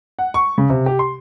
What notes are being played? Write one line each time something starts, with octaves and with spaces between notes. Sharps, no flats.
F#5
C#6
C#3
C3
G4
C6